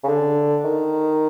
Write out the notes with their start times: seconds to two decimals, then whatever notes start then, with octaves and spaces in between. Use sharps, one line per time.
0.03 C#3
0.08 D3
0.64 D#3